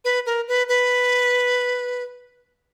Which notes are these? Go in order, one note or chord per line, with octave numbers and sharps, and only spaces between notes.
B4
A#4
B4
B4